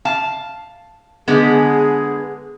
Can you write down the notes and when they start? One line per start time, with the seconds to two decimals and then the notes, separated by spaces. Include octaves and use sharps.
0.05 F5 A5
1.28 D3 G#3 B3 G#4